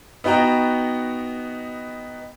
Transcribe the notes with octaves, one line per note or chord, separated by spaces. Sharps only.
B3 D#4 F#4 G5 A#5